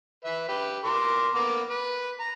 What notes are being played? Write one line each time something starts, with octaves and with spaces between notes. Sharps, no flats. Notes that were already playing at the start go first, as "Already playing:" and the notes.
B4 E5
G4 B4
A#4 C6 D6
A#3 B3 D6
B4
A#5